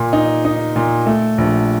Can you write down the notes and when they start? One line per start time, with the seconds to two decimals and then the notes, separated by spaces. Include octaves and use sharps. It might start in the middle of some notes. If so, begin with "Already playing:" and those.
Already playing: A#2
0.13 D#4
0.45 D#4
0.76 A#2
1.06 A3
1.38 A#1